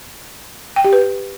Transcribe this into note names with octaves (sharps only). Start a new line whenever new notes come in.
G5
G4
B4